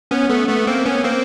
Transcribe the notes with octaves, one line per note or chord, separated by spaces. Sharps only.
B3 C#4
A3 B3
A3 B3
A#3 C4
B3 C#4
A#3 C4